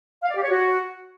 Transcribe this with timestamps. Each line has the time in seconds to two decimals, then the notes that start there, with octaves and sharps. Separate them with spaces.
0.23 F5
0.30 D5
0.37 G4
0.44 C#5
0.50 F#4